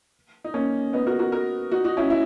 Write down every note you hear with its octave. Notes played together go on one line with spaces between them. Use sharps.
D#4
A#3 C#4
B3 D#4
F#4 A#4
F#4 A#4
F#4 A#4
D#4 F#4
D#4 F#4
C#4 E4
E4